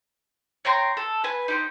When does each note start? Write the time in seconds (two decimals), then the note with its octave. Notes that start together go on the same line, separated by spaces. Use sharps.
0.65 C#5 G5 A#5 C6
0.97 A4
1.24 B4 G#5
1.48 D#4 G4 C5